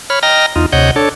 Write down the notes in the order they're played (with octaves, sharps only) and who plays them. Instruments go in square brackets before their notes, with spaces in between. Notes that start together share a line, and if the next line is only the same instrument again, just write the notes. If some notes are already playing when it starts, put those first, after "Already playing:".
[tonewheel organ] C#5 B5 F6
D#5 G5 A#5 F6 A#6
E2 D#4 F4
D2 C3 C#5 D#5 F#5 G6
D4 A4 C#5